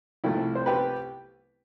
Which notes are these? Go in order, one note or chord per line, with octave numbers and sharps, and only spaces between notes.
C2 C3 F3 A3 E4
C5
G4 B4